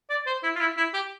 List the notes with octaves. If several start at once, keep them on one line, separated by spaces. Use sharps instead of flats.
D5
C5
E4
F4
E4
E4
G4